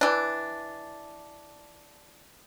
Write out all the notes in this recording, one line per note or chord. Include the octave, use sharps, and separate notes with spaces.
E3 D4